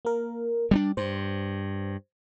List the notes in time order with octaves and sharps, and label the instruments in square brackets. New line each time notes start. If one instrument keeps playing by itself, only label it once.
[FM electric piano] A#3 A#4
[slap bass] G3 A#3 D4
[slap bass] G2 [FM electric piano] C5